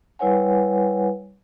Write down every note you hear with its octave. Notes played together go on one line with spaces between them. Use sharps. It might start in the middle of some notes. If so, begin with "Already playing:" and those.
G3 E4 B4 C#5 F#5 G#5